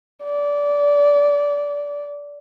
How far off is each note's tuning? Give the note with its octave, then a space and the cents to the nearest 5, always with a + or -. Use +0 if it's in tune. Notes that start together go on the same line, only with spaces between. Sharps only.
D5 -20